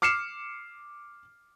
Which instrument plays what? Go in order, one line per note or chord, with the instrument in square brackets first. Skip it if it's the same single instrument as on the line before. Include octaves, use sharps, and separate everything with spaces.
[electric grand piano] D6 F6 C7 C#7 E7